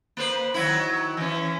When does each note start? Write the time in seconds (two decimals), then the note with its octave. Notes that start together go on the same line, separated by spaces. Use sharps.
0.17 A#3 B4 C5
0.54 D#3 F#3 E4
1.17 E3 C#4